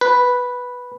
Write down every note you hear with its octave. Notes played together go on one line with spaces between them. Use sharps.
B4